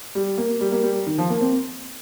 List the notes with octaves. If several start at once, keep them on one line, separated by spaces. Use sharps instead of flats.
G3
A#3
G3
A#3
G3
D#3
F3
A#3
C4